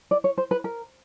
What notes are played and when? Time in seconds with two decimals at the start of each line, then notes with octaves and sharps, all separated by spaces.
0.11 D5
0.24 C#5
0.38 C5
0.51 B4
0.64 A#4